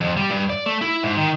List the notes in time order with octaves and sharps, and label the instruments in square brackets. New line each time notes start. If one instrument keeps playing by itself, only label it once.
[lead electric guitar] F2
G3
G2
D5
A3
E4
G#2
D#3